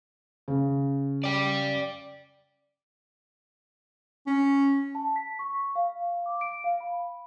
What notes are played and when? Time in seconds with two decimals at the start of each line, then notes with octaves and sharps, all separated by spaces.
0.48 C#3
1.24 D5 G5
4.27 C#4
4.95 A5
5.16 B6
5.39 C#6
5.75 F5
6.26 D6
6.41 D7
6.64 F5
6.80 B5